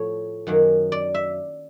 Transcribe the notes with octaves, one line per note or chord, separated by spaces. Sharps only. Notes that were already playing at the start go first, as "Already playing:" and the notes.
Already playing: A2 F3 A3 C#5
F#2 D#3 F#3 A#3
D5
E5